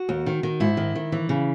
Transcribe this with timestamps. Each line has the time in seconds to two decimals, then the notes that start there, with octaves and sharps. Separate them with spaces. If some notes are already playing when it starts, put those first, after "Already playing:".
Already playing: F#4
0.09 D#2
0.26 D#3
0.43 D#3
0.60 G#2 E4
0.77 D#3
0.95 D#3
1.12 E3
1.29 C#3